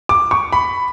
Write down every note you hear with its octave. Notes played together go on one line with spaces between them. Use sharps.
D6
C#6
B5